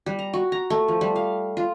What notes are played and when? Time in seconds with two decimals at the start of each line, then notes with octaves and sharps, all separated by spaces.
0.06 G3
0.19 A#5
0.33 F#4
0.52 A#5
0.70 A3
0.88 F3
1.01 G3
1.16 F5
1.57 F4